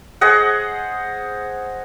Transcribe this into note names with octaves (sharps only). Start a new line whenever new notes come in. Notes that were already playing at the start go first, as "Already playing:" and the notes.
G#4 C5 D#5 F#5